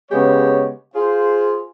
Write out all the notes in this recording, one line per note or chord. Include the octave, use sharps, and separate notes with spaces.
C#3 G#3 B3 G4 C#5
F4 G#4 C5